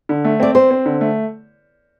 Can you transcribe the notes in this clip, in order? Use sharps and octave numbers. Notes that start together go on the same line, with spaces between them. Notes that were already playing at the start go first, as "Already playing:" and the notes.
D3
A3
C4 D5
C4 C5
C4
D3
A3